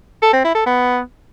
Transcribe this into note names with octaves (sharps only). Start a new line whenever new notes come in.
A4
C4
E4
A4
B3